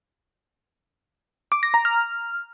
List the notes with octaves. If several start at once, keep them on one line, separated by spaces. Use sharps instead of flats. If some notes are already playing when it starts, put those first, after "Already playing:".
D6
A#6
A#5
F6